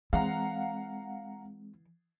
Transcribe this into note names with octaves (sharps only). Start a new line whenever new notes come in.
E3 G#3 C4 F5 F#5 A#5